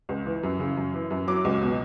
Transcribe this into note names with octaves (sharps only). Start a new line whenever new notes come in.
C#2
E3
F#2
C#3
F#2
E3
F#2
F#3 D6
C#2
B2